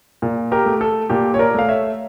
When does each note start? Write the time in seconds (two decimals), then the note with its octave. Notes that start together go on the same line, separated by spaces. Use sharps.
0.22 A#2
0.52 G4 A#4
0.66 A3
0.81 A4
1.10 A#2 G4
1.34 C#5
1.39 A#4 D5
1.54 A3 F5
1.69 C#5 E5